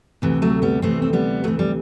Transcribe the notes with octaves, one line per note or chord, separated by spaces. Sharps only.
D2 C3 E3
F#3 A3
G3 B3
D2 C3 E3 A3 C4
C4
G3 B3
D2 C3 E3 F#3 A3
G3